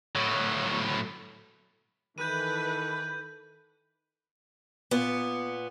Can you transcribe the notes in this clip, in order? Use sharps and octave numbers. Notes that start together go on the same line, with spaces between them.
A2 F#3
D#3 E3 A4 B4 G6 D#7
A#2 B3